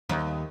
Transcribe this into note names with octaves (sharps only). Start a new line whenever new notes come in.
D#2